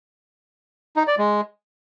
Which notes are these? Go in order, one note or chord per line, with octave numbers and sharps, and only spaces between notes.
D#4
D5
G#3